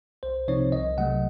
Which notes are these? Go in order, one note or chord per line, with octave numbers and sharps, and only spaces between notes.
C2 C5
C3 F3 C4 D#4 C#5
C2 D#5
C3 F#3 A3 F#5